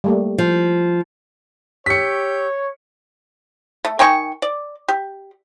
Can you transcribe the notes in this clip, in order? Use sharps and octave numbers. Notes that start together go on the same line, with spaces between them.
G3 A3 A#3
F3
G4 C#5 E6 G6 B6 C#7
A3
D#3 G5 G#5 C#6
D5
G4